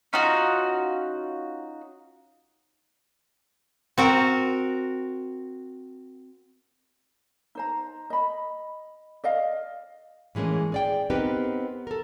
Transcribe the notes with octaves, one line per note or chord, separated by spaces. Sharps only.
C#4 D#4 F4 F#4
C4 F#4 A#4
D#4 C5 A#5
D#5 B5
D5 D#5 F5
A2 E3 G#3 A#3 C#4
G#4 D5 G5
B3 C4 D#4 G4 A#4 B4
A4 A#4